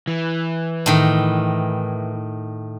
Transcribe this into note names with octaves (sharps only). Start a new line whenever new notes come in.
E3
A2 D#3